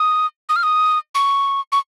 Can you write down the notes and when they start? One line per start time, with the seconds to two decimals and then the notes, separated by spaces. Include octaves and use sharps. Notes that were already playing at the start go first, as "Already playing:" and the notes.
Already playing: D#6
0.49 D#6
0.56 F6
0.63 D#6
1.15 C#6
1.72 C#6